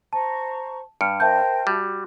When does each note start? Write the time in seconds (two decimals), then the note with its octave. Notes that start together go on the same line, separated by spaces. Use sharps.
0.13 C5 A5 A#5 C#6
1.01 G2 F6 C#7 D7
1.20 A#4 C5 E5 G5 A5 G6
1.67 G3 F#4